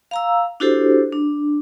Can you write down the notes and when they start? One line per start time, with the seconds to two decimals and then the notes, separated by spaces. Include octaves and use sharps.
0.11 F5 A#5 E6
0.60 D4 E4 F#4 G4 A4 C5
1.12 D4